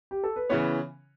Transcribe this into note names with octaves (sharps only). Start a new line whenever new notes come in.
G4
A4
B4
C#3 E3 B3 C#5